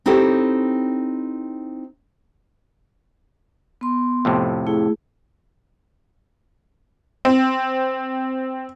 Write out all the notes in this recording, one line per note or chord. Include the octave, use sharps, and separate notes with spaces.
C4 D#4 E4 G4 A4 C#5
B3 C6
F2 A2 C3
A3 E4 G#4
C4